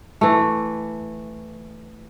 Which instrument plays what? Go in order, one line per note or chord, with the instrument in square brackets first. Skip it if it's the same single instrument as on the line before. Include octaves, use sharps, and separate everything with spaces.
[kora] E3 A3